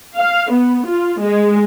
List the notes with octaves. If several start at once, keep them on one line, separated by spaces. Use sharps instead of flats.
F5
B3
F4
G#3